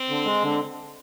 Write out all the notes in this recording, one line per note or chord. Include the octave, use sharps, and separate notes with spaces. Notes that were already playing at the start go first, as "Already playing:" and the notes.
Already playing: C4
D3
G#3
D3